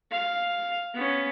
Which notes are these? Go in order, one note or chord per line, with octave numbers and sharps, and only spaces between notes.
F5
B3 C#4